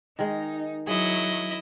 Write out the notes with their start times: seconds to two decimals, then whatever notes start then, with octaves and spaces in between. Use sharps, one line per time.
0.19 D#3 G#3 D#4
0.87 F#3 E4 G#4 D#5